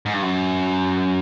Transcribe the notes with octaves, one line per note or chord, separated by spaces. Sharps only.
G#2
G2
F#2